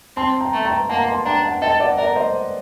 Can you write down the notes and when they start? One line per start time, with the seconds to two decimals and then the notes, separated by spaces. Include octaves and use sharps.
0.16 C4 A5 C6
0.41 G5 A#5
0.53 A3
0.65 G5 A#5
0.89 A#3 F#5 A5
0.98 A#5
1.08 A5 C6
1.25 D4 G5 A#5
1.43 F#5 A5
1.62 A4 D#5 G5
1.80 D5 F#5
1.98 A#4 D5 F#5
2.16 C5 D#5